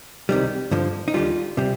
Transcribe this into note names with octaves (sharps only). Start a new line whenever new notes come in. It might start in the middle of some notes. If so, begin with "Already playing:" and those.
C2 C3 D#3 G3
G2 D3 F3
D#4
D#2 D3 G3 F4
C3 G3